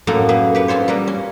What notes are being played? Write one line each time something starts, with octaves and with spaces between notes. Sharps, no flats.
F#2 A2 A#3 F#4 A4 A#5
A#3 G#4 B4
G4 B4 F#5
C4 C#4 F4 C5 C#5
G3 A#3 B4 A#5
C#4